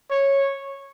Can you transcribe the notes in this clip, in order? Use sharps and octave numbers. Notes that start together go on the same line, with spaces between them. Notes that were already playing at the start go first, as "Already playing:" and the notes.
C#5